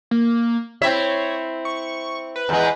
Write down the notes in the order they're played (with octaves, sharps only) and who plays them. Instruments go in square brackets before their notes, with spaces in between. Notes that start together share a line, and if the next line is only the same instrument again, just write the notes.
[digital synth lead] A#3
[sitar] C4 E4 E5 [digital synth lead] C#5
[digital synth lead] C#6
B4
[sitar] E2 G#3